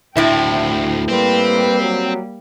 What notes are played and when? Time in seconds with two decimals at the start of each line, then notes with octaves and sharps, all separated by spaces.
0.17 D2 A2 C4 E4 G5
1.09 G3 A#3 C4 B4
1.81 F#3